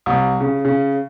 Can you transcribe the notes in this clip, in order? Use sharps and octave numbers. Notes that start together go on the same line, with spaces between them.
C2
C#3
C#3